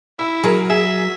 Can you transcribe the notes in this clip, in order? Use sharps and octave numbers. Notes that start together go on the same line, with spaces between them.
E4 E5
F#3 G#4 A#4
G#4 E5